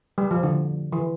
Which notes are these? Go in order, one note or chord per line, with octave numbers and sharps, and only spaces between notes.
G3
F3
D3
E3